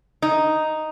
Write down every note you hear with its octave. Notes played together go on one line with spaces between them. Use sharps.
D#4